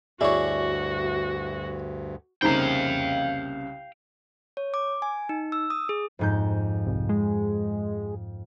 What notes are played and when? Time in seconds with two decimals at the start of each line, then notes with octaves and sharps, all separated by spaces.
0.21 D2 G2 E4 F#4 G#4 C#5 D5
2.42 C2 C#3 A#3 C4 D#4 F5 G5 A#5
4.57 C#5
4.74 D6
5.02 G#5
5.29 D#4
5.52 E6
5.70 D#6
5.89 G#4
6.19 F2 G#2 G6
6.86 C2
7.09 G#3